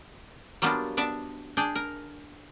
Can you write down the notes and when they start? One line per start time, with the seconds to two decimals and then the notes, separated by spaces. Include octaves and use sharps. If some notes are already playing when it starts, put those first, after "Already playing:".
0.62 F#3 G3 A#3 B3 D4 F4
0.97 B3 D4 D5 E5
1.57 D4 G#4 G5
1.75 A#4